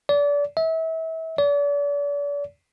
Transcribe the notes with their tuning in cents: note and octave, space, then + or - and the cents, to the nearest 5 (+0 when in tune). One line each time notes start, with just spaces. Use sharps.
D5 -30
E5 -30
D5 -40